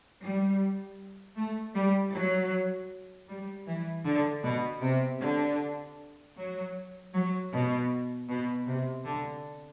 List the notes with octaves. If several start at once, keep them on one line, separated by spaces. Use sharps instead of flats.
G3
A3
G3
F#3
G3
E3
D3
B2
C3
D3
F#3
F#3
B2
B2
C3
D3